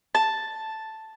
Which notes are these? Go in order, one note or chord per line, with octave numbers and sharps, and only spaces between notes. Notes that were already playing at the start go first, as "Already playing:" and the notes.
A5